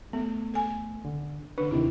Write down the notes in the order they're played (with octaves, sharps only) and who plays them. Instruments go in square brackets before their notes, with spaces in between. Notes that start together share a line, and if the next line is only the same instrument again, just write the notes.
[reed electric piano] A3 [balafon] B3
[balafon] A4 G#5
[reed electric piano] D3
[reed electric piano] D3 B4 [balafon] D4
[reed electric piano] D#2 C3 D#3 [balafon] E4